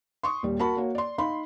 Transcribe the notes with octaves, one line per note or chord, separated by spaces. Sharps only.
C6 C#6 D#6
D#1 G3
F#4 A#4 A5 B5 C#6
A#3 F#4 C#5
D5 C6
D#4 F5 B5 C6